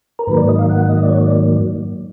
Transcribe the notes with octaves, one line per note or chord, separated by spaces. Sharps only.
A#4
G#2 D#3 F#3 A#3 B4
D5
D#5
F5
F#5
D#5
D5
C#5
D5